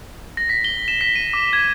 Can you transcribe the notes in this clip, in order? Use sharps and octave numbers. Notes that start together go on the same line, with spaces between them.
A#6
B6
G7
E7
B6
D#7
D6
G#6